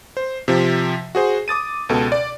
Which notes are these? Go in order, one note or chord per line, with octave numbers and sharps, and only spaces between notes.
C5
C3 F3
F#4 G#4 C5
D6 D#6 A6 D#7
C#2 B2 A4
D5